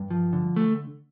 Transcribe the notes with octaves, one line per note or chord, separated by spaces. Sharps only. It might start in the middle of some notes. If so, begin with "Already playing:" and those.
Already playing: G2
F3
D3
A3